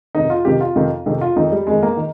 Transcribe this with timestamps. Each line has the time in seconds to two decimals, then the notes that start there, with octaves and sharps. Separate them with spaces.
0.15 F2 C3 D#3 D#4
0.30 F4
0.45 F2 C3 D#3 G4
0.61 F4
0.76 F2 C3 D#3
1.06 F2 C3 D#3
1.21 F4
1.36 F2 D#3 D#4
1.52 G3
1.67 F2 D#3 G#3
1.83 A#3
1.97 D#3